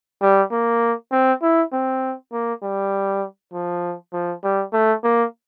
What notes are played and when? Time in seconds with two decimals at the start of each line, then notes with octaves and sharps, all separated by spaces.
0.21 G3
0.52 A#3
1.12 C4
1.42 E4
1.73 C4
2.32 A#3
2.62 G3
3.53 F3
4.13 F3
4.44 G3
4.73 A3
5.04 A#3